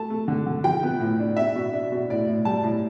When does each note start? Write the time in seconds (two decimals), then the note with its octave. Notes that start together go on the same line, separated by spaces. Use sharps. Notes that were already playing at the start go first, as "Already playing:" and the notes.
Already playing: A3 A5
0.10 A3
0.28 D3
0.46 D3
0.64 F3 G5
0.83 B3
1.00 A2
1.19 D4
1.37 D4 E5
1.55 B2
1.73 D4
1.92 B2
2.10 A2 D5
2.28 A2
2.45 G3 A5
2.63 A2